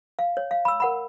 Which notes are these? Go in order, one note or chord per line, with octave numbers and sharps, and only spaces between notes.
F5
C#5
F5
B5 E6
A#4 F#5 B5